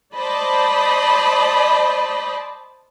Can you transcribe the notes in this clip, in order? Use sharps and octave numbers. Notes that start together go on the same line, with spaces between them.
C5 D5 D#5 A5 B5